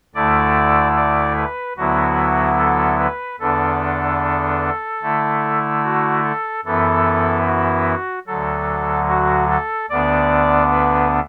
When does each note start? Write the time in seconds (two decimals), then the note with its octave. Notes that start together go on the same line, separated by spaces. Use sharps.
0.15 D2 D3 A3 E4 D5
0.96 D5
1.37 B4
1.77 D2 D3 F#3 B3 E4 F#4
2.58 A4
2.99 B4
3.40 E2 D3 B3 D4 A4
5.02 D3 A3 E4
5.84 F#4
6.24 A4
6.65 F#2 E3 B3 E4 A4
7.46 F#4
8.27 D2 D3 F#3 A4
9.08 F#4
9.49 A4
9.90 D2 D3 B3 D4 D5
10.71 B4